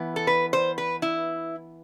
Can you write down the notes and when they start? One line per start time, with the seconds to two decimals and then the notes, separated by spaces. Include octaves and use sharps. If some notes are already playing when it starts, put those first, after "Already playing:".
Already playing: E3 B3
0.16 A4
0.27 B4
0.53 C5
0.78 B4
1.02 E4